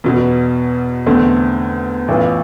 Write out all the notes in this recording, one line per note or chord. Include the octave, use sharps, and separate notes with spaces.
E2 B2 B3
E2 D3 A3 C4
A1 A2 E3 B3 F4